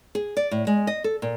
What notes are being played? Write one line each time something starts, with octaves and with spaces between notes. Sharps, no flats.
G#4
D5
A2
G#3
D#5
A4
A#2